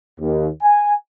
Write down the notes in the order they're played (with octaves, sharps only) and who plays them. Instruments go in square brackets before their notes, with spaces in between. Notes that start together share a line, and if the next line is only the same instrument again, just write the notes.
[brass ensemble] D#2
G#5